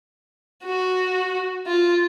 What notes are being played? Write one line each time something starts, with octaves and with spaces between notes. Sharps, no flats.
F#4
F4